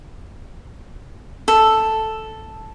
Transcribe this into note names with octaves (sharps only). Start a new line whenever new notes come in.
A4